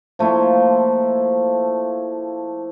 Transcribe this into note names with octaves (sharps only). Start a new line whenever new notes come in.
F3 A3 A#3 E4